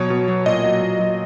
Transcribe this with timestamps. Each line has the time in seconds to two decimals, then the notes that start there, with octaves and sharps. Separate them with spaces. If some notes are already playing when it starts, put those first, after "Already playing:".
Already playing: B2 F#3 C#5
0.10 B2
0.28 F#3
0.46 A#2 D#5
0.64 F#3
0.82 A#2
0.99 F#3